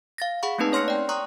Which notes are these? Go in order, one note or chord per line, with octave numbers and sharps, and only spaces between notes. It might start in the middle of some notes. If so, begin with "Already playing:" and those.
F5 A6 A#6
G#4 F#5 B5 C#6
A3 A#3 C4 D#4 B4 A5
C#4 C#5 C6 F6 A#6 C#7
D5 G5
A#5 C6 C#6 D#6 F#6